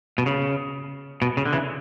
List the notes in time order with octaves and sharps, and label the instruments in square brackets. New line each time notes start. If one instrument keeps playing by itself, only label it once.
[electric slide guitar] B2
C#3
B2
C#3
D3
C#3 E3